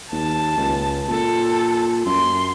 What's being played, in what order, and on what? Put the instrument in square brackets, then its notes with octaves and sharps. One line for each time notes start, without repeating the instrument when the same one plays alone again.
[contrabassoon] D#2 [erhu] A5
[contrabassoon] C#2
[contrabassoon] A#2 [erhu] A4
[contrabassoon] F#2 [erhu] C6